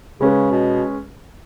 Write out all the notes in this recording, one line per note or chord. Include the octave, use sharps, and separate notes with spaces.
C#3 G#3 C#4 G#4 B4
B2